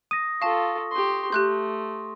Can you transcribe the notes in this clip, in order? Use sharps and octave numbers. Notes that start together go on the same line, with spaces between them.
D#6 A#6 D#7
F4 A4 F5 A5 C#6
G4 C6
A3 G4 C6 F#6 G6